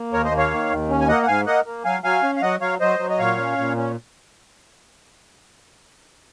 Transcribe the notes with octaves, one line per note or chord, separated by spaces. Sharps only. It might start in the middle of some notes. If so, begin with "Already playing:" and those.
Already playing: A#3
D#2 A#4 C#5
C5 D#5
A#3
C#5 F5
D#3
D#2
C#4
G#5
A#3 D#5 F#5
F#5
G#2 F5 G#5
A#3 D#5 F#5
A#3
F#3 F5 G#5
F#3 F5 G#5
C#4
F5
F#3 D#5 F#5
F#3 C#5 F5
F#3 C5 D#5
F#3
D#5
A#2 C#5 F5
C#4
A#2
C#4